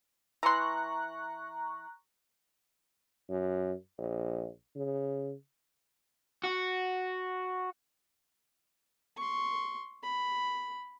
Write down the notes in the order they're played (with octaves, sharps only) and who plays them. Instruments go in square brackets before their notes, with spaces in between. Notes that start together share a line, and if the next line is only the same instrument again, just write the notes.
[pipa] E3 C6 [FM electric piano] A#5 C#6 F#6
[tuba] F#2
A#1
C#3
[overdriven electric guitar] F#4
[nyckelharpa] C6 C#6
B5